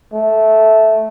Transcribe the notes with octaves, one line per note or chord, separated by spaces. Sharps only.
A3